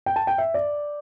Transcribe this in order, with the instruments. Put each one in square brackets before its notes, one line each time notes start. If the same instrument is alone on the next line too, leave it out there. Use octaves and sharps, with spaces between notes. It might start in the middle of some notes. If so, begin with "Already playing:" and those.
[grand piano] G5
A5
G5
E5
D5